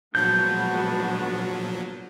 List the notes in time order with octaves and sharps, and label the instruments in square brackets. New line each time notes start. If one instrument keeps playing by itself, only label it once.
[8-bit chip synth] A#2 F3 F#3 [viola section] G#3 B3 F#4 [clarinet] D4 [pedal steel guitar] G6